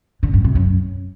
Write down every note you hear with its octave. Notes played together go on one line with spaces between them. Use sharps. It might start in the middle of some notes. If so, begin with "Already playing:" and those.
D3
G2
C3
F#2